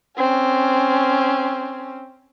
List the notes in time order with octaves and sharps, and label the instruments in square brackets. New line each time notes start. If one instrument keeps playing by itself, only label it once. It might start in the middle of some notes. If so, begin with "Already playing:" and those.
[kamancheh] C4 C#4